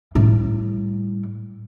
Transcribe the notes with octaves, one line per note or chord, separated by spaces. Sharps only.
A2 G3